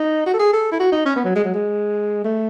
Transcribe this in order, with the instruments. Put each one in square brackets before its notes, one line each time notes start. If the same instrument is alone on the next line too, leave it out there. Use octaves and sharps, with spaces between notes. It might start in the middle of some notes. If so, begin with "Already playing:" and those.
Already playing: [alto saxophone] D#4
F#4
A4
G#4
A4
E4
F#4
D#4
C#4
B3
F#3
G#3
F#3
G#3
A3